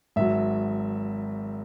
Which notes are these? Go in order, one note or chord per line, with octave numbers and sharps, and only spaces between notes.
G#1 G#2 F#3 E5